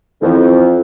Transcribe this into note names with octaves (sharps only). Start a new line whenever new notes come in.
F2 E3 C4